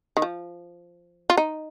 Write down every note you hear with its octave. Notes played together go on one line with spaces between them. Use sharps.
D#3
F3
F4
D#4